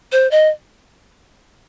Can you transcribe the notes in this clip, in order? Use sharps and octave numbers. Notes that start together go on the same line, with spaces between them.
C5
D#5